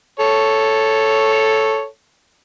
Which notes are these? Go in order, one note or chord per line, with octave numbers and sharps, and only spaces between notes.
A4 C#5